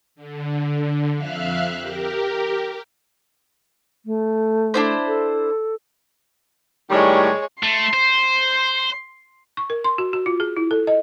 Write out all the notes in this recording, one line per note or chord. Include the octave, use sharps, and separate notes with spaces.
D3
F2 E5 F5 F6 F#6
G4 A#4
A3
D4 E4 C5
A4
A2 D#3 G3 G#3 C#5
A3 C6
C5
C#6
A#4
C6
F#4
F#4
F4
G#4
E4
A4
D#5